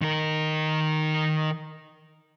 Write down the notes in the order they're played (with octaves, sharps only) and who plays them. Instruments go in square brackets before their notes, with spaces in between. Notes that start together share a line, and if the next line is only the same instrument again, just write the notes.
[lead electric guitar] D#3 A#4